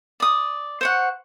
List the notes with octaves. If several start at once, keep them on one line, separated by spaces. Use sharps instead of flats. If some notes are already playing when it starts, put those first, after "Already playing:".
D5 D#6
C5 C#5 F#5